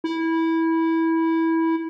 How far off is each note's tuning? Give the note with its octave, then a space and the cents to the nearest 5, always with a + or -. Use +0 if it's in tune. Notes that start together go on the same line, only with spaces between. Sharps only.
E4 -15